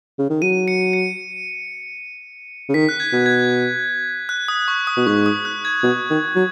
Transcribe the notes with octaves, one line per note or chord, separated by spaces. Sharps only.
C#3
D#3
F#3 D#7
C#7
C#7
C#3
D#3 B6
F#6
G#6
B2
G#6
F#6
D#6
C#6
D#6
B2
G#2 C#6
D#6
F#6
G#6
B2
D#3
F#3